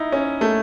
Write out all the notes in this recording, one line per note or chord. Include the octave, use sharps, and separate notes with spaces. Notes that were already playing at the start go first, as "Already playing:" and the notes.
Already playing: D#4 E4
C#4
A3